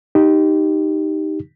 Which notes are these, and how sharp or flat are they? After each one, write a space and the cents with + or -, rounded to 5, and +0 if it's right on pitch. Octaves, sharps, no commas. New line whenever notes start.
D#4 +0 G4 +0